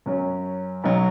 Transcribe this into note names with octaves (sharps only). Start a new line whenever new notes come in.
F#2 F#3 C#4
B1 B2 F#3